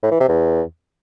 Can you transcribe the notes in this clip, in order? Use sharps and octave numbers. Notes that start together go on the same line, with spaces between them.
A2
E3
C3
E2